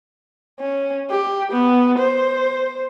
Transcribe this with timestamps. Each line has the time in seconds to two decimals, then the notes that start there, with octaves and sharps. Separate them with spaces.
0.60 C#4
1.11 G4
1.52 B3
1.98 C5